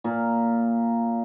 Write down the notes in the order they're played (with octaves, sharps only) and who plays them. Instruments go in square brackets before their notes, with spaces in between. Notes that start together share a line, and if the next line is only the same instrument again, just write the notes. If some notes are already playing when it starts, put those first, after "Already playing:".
[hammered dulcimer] A#2